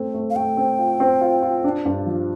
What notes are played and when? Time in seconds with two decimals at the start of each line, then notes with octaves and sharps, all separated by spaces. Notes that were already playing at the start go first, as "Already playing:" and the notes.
Already playing: A3 C4
0.14 A3
0.30 F5
0.36 A3 G5
0.57 C4
0.79 F4
1.00 C4
1.21 F4
1.42 F4
1.64 D4
1.85 G2
2.06 F3